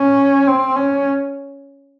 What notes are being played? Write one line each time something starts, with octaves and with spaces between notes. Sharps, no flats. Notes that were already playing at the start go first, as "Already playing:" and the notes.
Already playing: C#4
C4
C#4